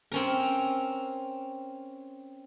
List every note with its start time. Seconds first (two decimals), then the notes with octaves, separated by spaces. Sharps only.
0.12 C4 C#4 A#4